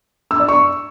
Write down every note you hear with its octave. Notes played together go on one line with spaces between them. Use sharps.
E6
D5
C#6